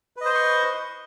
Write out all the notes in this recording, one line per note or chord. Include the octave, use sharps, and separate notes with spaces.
B4 C5 D#5 C6 C#6